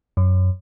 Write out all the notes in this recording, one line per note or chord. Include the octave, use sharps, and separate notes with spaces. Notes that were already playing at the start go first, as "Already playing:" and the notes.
F#2